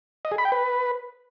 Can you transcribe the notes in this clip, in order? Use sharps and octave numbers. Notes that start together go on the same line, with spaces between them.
D#5
G#4
B5
G5
B4